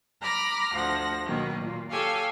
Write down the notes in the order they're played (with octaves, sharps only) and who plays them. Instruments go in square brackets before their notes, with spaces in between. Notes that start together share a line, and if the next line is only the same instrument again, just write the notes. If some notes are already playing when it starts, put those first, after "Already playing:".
[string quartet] A#5 B5 D6 F6 A#6
D2 F3 F#5 A#6
B2 D#3 F#3 A#3
A#2
G4 A4 C#5 F5 G#5